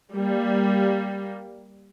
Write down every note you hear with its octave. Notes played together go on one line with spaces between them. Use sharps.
G3 A#3